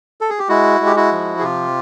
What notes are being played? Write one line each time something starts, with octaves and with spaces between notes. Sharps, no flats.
A4
G#4
G4
G#3 E4 F#4
G#3
G4
E4 F#4
F3
G#4
C3 F4 G4